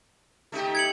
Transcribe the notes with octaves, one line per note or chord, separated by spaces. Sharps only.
A3 D#4 G4
G#6 C#7 F#7